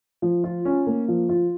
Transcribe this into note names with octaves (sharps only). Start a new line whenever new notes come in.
F3
F4
C#4
A#3
F3
F4